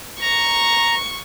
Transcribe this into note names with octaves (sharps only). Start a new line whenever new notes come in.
A#5 C#6